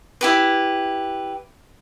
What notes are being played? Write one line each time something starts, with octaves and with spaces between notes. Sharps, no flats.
E4 G4 B4